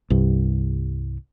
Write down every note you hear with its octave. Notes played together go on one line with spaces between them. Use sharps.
C2 G2